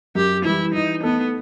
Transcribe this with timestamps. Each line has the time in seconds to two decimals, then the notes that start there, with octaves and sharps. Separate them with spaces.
0.15 F#2 G4
0.45 E3 G3 E4
0.74 E3 D#4
1.03 A3 B3 D#4 A4